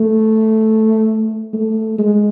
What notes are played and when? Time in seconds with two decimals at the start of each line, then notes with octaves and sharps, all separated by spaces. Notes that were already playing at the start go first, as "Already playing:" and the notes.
Already playing: A3
1.53 A3
1.98 G#3